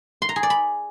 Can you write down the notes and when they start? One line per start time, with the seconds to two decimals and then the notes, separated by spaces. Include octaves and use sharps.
0.22 C6
0.29 A#5
0.36 G#4
0.43 D5
0.50 B5